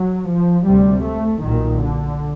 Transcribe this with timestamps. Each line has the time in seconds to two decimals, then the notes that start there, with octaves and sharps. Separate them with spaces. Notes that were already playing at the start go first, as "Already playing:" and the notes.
Already playing: F#3
0.29 F3
0.67 D2 C3 G3
1.04 A3
1.42 B1 A#2 D#3
1.80 D3